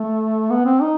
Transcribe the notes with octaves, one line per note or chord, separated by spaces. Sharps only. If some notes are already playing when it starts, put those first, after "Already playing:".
Already playing: A3
B3
C4
D#4